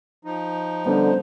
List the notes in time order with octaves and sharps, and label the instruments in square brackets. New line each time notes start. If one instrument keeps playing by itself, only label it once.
[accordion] F3 D#4
[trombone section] D3 [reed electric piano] G3 B3 C#4 [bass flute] C5